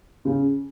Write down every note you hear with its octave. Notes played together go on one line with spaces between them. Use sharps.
C#3